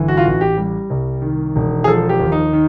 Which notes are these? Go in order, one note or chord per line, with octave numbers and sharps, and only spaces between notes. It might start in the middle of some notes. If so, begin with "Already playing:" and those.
Already playing: G1 E3
F#4
F4
A1 F#4
G4
G3
C2
D#3
E1
G#4
F3 A4
G4
D#2
D#4
D#3